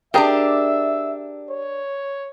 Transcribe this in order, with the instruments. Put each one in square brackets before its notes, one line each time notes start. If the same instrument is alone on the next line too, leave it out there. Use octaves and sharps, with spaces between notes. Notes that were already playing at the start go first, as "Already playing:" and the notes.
[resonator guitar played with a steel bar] D4 A#4 [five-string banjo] G4 G#4 A#5 [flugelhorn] E5
[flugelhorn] C#5